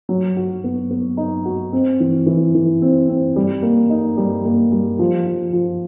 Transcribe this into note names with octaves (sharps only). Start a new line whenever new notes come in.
F#3
F#4
B3
B3
D#4
F#4
C4
E3
E3
E3
C4
C4
G3
A#3
D#4
G3
A#3
G3
F3
F3
F3